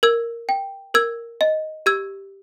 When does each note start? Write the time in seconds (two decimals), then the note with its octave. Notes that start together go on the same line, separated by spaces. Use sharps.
0.03 A#4 E6 G#6
0.49 G5
0.94 A#4 E6 G#6
1.41 D#5
1.86 G4 E6 G#6